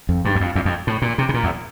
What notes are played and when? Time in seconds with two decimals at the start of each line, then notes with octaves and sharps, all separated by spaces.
0.09 F2
0.25 G2
0.35 E2
0.40 F2
0.55 E2
0.65 F2
0.87 A2
1.02 A#2
1.18 C3
1.29 C3
1.34 A#2
1.44 E2